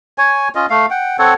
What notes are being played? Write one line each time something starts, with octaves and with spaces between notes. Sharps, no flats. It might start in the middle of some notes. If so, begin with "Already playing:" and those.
C#5 G#5
C#4 F4 D#5
A3 F5
F#5 G5
C4 A4 C#5 F#5